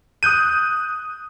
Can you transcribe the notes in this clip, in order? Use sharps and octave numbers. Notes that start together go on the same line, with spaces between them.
D#6 F#6 G6 D#7